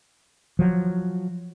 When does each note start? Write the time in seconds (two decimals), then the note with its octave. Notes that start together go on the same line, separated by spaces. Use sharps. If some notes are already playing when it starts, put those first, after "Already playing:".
0.59 F3 F#3